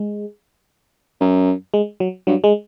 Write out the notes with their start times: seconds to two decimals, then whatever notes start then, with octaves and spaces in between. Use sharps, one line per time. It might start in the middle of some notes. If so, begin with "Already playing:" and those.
Already playing: G#3
1.21 F#2
1.74 G#3
2.00 F#3
2.27 G2 F#3
2.44 G#3